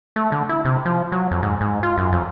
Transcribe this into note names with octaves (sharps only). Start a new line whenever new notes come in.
A3
D3
E4
C3
F3
F#3
F2
G#2
G#2
F4
F#2
F2